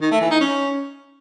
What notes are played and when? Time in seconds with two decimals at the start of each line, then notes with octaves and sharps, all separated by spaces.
0.01 D#3
0.11 A3
0.21 E3
0.31 D#4
0.40 C#4